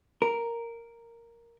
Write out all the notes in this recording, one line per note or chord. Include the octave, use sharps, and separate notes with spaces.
A#4